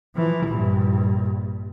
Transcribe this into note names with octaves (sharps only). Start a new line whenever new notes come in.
E3 F3
A#1 G2